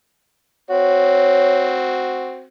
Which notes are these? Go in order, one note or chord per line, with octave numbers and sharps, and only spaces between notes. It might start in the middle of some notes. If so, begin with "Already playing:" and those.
C4 F#4 C#5